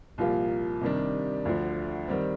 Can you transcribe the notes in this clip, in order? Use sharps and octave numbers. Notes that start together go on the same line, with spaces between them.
C2 A#2 F3 A#3 F4
C3 D#3 G3 D4
D2 D3 F3
D#3 G3 C4